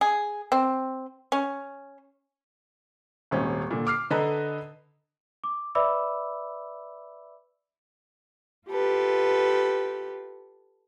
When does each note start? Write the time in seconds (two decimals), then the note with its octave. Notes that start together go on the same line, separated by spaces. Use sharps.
0.01 G#4
0.52 C4
1.32 C#4
3.31 D#1 G#1 C#4
3.71 A#2 D3
3.87 D6 F6 C7
4.10 D3 A4 B4 D#5 A#5
5.44 D6
5.75 B4 D5 E5 B5 D6 E6
8.68 F4 G4 A4 B4